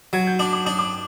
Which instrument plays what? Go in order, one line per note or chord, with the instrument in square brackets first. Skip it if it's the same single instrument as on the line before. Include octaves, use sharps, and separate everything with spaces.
[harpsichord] F#3 [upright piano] G#6
[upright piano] G6
[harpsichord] D4 [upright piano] D6
[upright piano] D6
[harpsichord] D4 [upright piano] D#6
[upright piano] D6